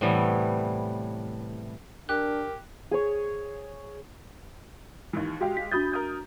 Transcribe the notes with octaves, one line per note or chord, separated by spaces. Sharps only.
A2 C3 E3 G3 A3 B3
D4 G4 A#4 F#6
G#4 C#5
D#2 D#3 E3
G#3 F#4 G4 F5 G5
B6
D4 F#4 B5 D#6 G6 A6
A#4 D#6 G6